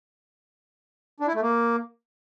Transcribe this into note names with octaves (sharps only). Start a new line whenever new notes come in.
D4
E4
A3
A#3